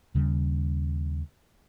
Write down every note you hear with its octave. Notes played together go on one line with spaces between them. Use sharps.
D#2 C#3 G3